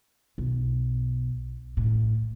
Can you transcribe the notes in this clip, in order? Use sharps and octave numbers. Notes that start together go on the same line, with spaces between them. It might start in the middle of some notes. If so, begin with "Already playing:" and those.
B1
A2